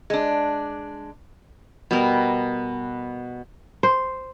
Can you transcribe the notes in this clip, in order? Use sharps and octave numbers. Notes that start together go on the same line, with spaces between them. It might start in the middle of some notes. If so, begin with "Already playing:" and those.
G#3 D4
B2 G3 A#4
C5